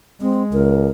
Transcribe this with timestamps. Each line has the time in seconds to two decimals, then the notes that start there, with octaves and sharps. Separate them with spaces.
0.21 G#3 C4
0.53 C#2 A#4